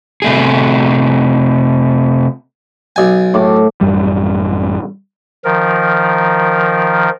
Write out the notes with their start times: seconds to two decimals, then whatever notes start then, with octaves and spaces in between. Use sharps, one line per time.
0.22 C3 A3 G#4
2.96 B1 G#5
3.34 A2 D6
3.81 A1 F#2 G3
5.45 D#3 F3 A#4